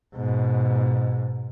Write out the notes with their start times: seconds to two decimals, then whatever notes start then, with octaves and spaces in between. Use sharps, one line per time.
0.15 G#2 B2